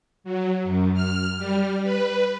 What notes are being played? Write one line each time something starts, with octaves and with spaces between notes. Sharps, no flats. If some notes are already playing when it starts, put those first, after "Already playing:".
F#3
F#2
F6
G3
B4